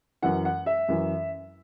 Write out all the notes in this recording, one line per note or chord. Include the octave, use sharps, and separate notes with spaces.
F#2 E3 F#5
F#5
E5
F#2 E3